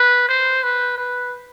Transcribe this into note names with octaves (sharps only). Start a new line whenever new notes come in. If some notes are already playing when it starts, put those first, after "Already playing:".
Already playing: B4
C5
B4
B4